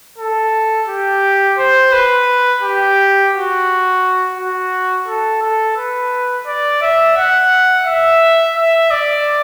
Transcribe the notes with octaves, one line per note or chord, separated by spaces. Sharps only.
A4
G4
C5
B4
G4
F#4
F#4
A4
A4
B4
D5
E5
F#5
E5
E5
D5